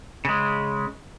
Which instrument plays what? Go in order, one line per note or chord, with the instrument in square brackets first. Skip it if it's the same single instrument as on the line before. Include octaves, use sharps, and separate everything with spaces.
[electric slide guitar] C#3 G#3